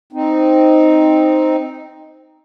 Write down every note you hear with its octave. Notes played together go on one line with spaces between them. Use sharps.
C4 D#4